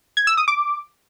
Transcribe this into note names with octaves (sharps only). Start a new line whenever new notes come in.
G#6
E6
D#6
D6